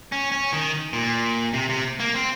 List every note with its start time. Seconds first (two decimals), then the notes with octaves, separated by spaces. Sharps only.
0.12 C#4
0.32 C#4
0.53 D#3
0.93 A#2
1.54 C3
1.69 C3
2.00 A#3
2.14 C4